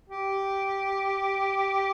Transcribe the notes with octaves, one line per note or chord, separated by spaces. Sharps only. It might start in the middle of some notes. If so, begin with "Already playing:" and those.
G4